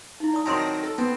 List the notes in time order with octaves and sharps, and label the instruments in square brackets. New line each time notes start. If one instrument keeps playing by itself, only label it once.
[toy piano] D#4 E4
D5 A5 D#6
[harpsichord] D#3 F#3 C4 [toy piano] A5 C6 [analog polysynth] A#5
[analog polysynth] A#6
A4
[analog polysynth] B3 [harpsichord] C4